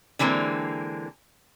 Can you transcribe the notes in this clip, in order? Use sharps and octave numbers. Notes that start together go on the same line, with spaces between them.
D3 E3 G#3 A#3 C4